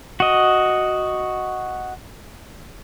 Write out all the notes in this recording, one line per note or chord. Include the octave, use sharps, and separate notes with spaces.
F#4 D#5